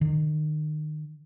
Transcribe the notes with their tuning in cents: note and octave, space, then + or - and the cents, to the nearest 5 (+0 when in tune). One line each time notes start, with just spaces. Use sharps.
D#3 -30